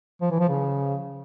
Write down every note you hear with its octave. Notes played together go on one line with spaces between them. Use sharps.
F3
E3
F3
C#3